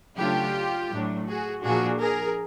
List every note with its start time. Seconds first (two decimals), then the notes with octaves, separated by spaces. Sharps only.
0.17 C#3 F#3 A3 D4 F4 G4
0.91 A2 F#3 A3 D4
1.26 F#4 G#4
1.62 A#2 F3 A#3 D4 F#4 G#4
1.99 G#4 A#4